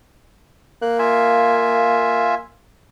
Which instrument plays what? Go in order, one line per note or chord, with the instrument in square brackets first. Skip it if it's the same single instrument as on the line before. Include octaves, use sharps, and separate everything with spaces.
[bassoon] A#3 [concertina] F#6
[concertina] F4 E5 G#5